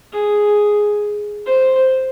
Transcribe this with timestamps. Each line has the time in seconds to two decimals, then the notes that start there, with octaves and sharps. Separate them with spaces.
0.13 G#4
1.47 C5